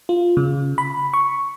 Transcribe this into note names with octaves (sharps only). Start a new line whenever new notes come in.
F4
C#3
B5
C#6